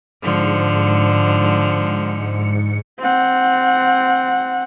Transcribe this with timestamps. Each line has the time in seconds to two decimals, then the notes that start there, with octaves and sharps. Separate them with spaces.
0.22 G#2 D3 F3 C#7
2.99 C4 F#5